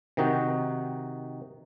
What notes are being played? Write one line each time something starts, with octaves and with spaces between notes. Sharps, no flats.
C3 D#3 D#4 F#4 G5